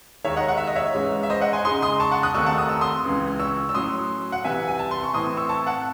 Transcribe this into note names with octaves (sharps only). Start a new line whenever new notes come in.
D#2 D#3 G#3 D#4 C#5 E5
D#5 F#5
F#5
E5
D#5
C#5 E5
G#2 E3 G#3 C#4
E5
C5 D#5
D#5 F#5
G#5 C6
C#3 G#3 D#4 C6 D#6
C6 D#6
A5 C#6
F#5 A5
D#6 F#6
D#2 D#3 A3 C4 D#4 C#6 E6
F#5 A5
D#6
E6
C6 D#6
C#2 C#3 E3
C#6 E6
E6
A2 F#3 C#4 C6 D#6
F#5
C2 C3 E3 E5 G#5
G#5
A5
C6
C#6
A2 E3 C4 E4 C6 D#6
C#6 E6
A5 C#6
F#5 A5